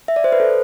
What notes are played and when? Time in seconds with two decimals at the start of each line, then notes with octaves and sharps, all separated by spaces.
0.08 E5
0.16 D5
0.24 C5
0.32 B4
0.40 A4